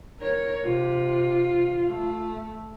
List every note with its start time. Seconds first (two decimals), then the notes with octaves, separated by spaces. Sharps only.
0.20 A#4 C#5
0.65 C3 F4
1.88 A3